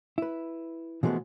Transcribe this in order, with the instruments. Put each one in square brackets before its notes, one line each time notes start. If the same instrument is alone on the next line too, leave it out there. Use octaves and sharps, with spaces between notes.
[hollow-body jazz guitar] E4 B4
B2 E3 F3 G#3 A3 B3